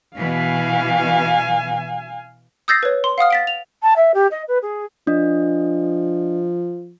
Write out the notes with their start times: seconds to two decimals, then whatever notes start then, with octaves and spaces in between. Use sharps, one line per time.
0.17 B2 E3 F5 G#5
2.68 D#6 E6 G6 A6 A#6 C7
2.83 B4 C#5
3.04 C6
3.18 F5 F#5 D#6 F6
3.30 A6 B6 D7
3.47 F7
3.82 A5
3.96 E5
4.14 G4
4.31 D#5
4.48 B4
4.62 G#4
5.07 F3 D4 D#5